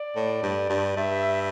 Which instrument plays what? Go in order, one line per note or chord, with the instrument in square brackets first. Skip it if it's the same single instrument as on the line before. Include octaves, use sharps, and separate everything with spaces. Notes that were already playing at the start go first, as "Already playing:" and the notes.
Already playing: [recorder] D5
[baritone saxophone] A2
G2
G2
[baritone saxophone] G2 [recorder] E5